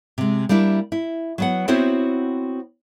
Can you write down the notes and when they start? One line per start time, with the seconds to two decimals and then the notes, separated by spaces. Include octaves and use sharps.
0.18 C3 G#3
0.49 G3 A#3 D4 E4
0.92 E4
1.38 F#3 B3 F#5
1.68 B3 C4 E4 F#4 C5 C#5